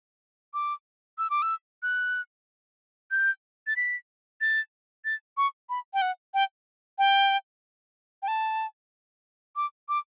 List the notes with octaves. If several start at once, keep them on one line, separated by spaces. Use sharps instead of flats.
D6
E6
D6
E6
F#6
G6
A6
B6
A6
A6
C#6
B5
G5
F#5
G5
G5
G5
A5
D6
D6